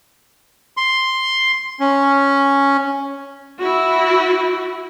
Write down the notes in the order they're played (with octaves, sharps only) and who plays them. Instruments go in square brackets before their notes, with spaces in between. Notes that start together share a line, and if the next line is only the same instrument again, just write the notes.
[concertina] C6
C#4
[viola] E4 F#4